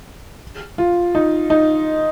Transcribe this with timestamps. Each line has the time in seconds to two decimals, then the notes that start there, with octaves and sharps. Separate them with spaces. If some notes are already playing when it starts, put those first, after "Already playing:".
0.78 F4
1.15 D#4
1.50 D#4